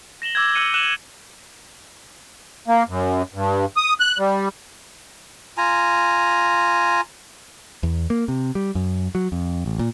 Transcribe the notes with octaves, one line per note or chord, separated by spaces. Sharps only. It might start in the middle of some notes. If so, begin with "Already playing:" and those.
A#6 E7 F#7 G7
D6 E6 G6 G#6
E6 F#6 C#7 D#7 F#7 G7
F#6 D#7 E7 F#7 G7
A#3
F#2
G2
D#6
F#6
G3
F4 G#5 A#5
E2
A#3
C3
G3
F#2
F#3
F2
A1
A#2